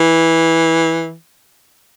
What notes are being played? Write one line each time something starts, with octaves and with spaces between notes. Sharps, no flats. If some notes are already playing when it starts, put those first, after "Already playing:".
Already playing: E3